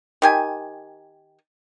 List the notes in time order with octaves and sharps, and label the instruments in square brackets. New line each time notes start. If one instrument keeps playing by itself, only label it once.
[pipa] D#3 G4 G#5